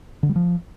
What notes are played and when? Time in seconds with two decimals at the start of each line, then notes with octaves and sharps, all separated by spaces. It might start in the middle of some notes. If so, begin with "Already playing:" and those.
0.23 D3
0.29 G3
0.36 F3